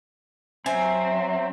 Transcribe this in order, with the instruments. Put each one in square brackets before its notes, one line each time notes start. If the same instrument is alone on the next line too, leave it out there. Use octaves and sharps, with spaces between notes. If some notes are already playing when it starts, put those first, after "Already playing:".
[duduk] F#3 [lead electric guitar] C4 [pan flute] E5 [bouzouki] G#5